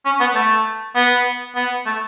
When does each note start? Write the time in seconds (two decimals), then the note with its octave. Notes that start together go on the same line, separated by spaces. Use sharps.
0.05 C#4
0.20 B3
0.35 A3
0.95 B3
1.56 B3
1.86 A3